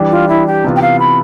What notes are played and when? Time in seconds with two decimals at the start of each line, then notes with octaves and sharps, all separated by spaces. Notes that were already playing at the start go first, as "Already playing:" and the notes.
Already playing: E3 G3 D4 G4
0.10 F4
0.28 E4
0.47 G4
0.64 C3 E3 B3 F4
0.76 G5
0.82 F5
0.99 B5